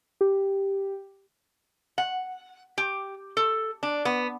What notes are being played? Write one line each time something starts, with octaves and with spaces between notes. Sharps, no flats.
G4
F#5
G4
A4
D4
B3